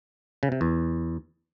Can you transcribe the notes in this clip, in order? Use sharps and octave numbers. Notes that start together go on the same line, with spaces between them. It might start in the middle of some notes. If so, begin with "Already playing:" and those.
C#3
C3
E2